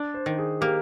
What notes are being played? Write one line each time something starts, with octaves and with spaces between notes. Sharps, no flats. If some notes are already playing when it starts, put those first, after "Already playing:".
Already playing: D4
C5
D#3
G#4
A#3 G4